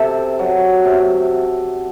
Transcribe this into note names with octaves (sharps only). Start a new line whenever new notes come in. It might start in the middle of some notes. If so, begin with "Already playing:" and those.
Already playing: C3 A4
F#3
C3